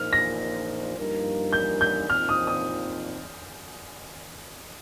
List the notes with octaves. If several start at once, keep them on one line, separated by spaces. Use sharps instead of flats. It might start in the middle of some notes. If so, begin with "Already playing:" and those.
Already playing: A#1 A#2 A#3 D#4 C5 F6
A#6
G2 F3 A#3 D#4 A#4
G6
G6
A#1 A#2 F3 C4 D#4 F6
D#6
D#6